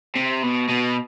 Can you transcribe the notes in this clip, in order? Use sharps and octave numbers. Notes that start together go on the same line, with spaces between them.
C3
B2
B2